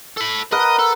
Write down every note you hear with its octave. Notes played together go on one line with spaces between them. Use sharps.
A4 B5
A#4 B4 D#5 F#5
A4